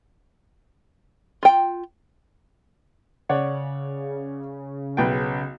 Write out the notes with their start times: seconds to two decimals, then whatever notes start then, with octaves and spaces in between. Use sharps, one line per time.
1.43 F4 G5
3.29 C#3 C#5 D5 F#5
4.97 B1 B4 G5